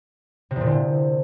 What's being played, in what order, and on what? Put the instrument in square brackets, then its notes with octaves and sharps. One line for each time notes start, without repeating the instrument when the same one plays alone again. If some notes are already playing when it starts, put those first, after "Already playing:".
[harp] C3
E2
A#2
D3
C3